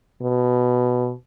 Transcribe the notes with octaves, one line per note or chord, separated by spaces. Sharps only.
B2